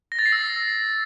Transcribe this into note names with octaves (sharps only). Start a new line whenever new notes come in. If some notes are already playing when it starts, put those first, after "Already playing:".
A#6
A6
C7
E6